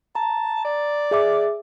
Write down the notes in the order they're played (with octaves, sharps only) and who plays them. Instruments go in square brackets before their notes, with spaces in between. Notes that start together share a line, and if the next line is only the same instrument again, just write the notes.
[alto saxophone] A5 [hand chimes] A#5
[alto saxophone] D5
[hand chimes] G#4 E5 D6